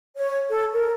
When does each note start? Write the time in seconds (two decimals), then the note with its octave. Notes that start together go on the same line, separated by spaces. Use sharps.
0.17 C#5
0.49 A4
0.73 A#4